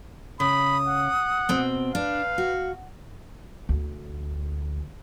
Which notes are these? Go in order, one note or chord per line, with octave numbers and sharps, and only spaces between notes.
C#3 B5 D#6
F#5
B2 C4
D4 B4 F5
F#4
D2